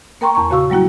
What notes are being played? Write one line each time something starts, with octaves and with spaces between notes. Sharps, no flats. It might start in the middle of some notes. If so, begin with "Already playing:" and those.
A#3 A#4 G5 A#5 C6 C#6
E2 A5 A#5 C#6
A#2 C#3 F#4 F5 C#6 E6
F#3 G3 A#3 E4 F#4